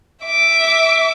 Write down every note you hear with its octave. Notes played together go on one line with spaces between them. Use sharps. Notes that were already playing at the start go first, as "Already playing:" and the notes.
E5 D6